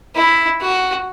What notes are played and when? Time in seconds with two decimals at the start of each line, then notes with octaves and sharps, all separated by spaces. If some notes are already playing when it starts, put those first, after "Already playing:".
0.15 E4
0.60 F#4